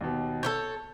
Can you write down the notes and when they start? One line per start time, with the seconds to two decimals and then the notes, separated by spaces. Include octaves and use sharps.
0.01 D#2 B2
0.43 A4 C5 C#5 G6